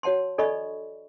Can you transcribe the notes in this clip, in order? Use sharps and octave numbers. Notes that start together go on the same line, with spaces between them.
F#4 C#5 F#5 A5 C6
D4 A4 D5 D#5 B5 C#6